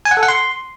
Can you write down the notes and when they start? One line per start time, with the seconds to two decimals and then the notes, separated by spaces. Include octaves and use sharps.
0.05 G#5
0.11 F#5
0.17 A4
0.23 F#5
0.28 C6